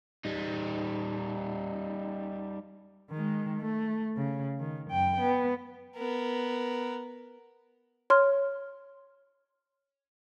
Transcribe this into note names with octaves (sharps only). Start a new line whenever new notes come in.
G3 D#4
D#3 G#3
A3
C#3
D#3
F#2 G5
B3
B3 A#4
C#5 C6 F6